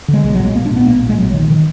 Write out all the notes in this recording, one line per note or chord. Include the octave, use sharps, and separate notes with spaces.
D3 G#3
B1 G#3
F#3
A#2
G#3
B1 A#3
D4
A#2 B3
B1 A#3
A#2
G#3
B1 F#3
A#2 D#3
D#3